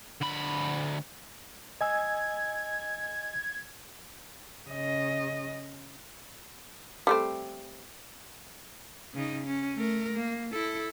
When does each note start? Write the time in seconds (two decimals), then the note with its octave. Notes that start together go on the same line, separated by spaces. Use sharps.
0.21 D2 B5
1.81 D#5 G#5 E6 G#6
4.68 C#3 D#5
7.07 G3 A3 C4
9.14 C#3 D#4
9.47 C#4
9.76 A3 A#4
10.15 A#3
10.52 E4 A4